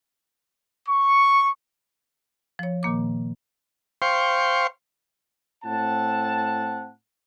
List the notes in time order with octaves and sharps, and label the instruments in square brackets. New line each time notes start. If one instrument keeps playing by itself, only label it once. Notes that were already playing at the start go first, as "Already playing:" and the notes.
[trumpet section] C#6
[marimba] F3 C#5
A#2 D#3 A#3 D6
[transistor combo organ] C5 F5 G5 C6 C#6
[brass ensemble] A2 C4 F#5 A5